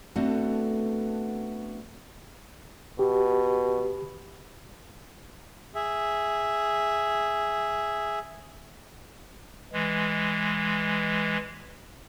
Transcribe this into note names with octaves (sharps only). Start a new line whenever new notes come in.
A3 B3 C4 D4 F#4 A4
B2 G4
G#4 E5
E3 G#3